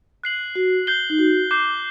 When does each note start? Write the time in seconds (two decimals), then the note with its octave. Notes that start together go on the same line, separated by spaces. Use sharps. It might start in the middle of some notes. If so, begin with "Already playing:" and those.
0.24 F#6 C7 F#7
0.55 F#4
0.87 G6 C7 G7
1.10 D#4
1.19 F#4
1.51 D6 G6 C7